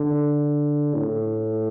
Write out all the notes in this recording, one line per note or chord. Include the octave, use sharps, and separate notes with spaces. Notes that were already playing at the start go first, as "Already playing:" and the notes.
Already playing: D3
A2